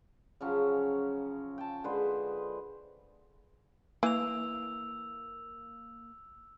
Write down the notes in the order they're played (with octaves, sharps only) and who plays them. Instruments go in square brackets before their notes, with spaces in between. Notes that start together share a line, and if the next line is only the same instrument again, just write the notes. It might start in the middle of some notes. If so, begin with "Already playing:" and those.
[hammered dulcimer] C#3 F3 F#3 C#4
G5 A5
D3 G#3 B4 C5
[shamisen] E3 [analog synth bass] A#3 [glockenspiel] E6 F7